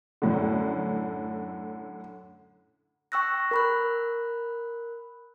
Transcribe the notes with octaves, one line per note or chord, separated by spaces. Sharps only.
F#2 A2 D3
G5 C#6 E6 F#6 A#6
A#4 B5 F#6